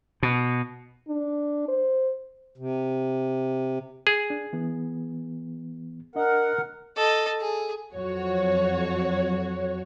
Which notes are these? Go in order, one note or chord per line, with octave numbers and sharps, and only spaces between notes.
B2
D4
C5
C3
G#4
D4
E3 B3
D4 A#4 D#5 F#5
A4 D#5
G#4
F2 F#3 F#4 C#5